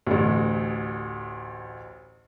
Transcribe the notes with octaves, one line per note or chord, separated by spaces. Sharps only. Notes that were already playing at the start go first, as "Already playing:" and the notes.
A1 D2